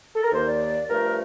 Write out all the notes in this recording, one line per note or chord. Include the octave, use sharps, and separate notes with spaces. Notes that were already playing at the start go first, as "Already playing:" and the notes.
A4
A#4
D#2 D#3 A#3 C5
D5
G2 F3 A3 A#4